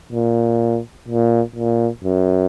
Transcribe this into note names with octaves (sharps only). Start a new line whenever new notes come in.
A#2
A#2
A#2
F#2